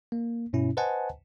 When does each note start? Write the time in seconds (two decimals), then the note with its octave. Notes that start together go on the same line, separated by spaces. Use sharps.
0.12 A#3
0.53 G2 B2 C#4 E4
0.77 B4 C5 D#5 F#5 G#5 A5